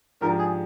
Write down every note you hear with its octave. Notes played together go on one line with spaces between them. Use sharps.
G#2 F3 G#3 D4 G4 A#4
G#4